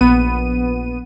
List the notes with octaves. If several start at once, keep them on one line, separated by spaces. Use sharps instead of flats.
A#1 B3 D#7